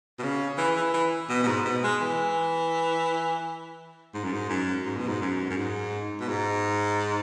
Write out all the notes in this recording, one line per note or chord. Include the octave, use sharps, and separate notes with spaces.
B2
C#3
E3
E3
E3
B2
B2
G#2
B2
G#3
E3
G#2
F#2
G#2
F#2
G#2
B2
G#2
F#2
F#2
G#2
B2
G#2